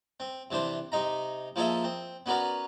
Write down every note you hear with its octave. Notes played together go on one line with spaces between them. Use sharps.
C4
C3 E3 D4 C5
C3 D#4 A#5
F3 A#3 G#4 A4 D#5 E5
C4
B3 C#4 F#4 A#4 B4 D5